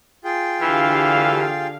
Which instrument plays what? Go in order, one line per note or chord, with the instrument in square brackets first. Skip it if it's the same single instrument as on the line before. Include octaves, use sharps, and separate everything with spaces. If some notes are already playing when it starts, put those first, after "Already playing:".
[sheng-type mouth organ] F4 G#4 G5
[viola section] D3 G4 F5 [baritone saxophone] E3